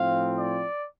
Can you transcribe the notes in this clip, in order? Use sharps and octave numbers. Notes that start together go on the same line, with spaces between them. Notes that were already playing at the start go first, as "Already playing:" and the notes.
Already playing: A2 F3 C4 F5
D5